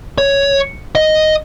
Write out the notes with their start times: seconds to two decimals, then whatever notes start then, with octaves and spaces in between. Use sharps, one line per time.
0.18 C#5
0.95 D#5